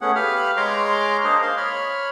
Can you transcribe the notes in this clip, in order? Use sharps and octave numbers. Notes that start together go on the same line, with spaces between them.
A3 B3 C#4 G#4 F#5
G4 B4 F5 B5 F6
G#3 C#5 A#5 C6 D6 F6
A#3 D4 G#4 C5 D#5
F5 C6
C#5 B5 F6